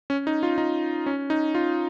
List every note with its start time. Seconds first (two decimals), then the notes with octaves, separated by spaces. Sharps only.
0.10 C#4
0.27 D#4
0.43 F4
0.58 D#4
1.06 C#4
1.30 D#4
1.55 F4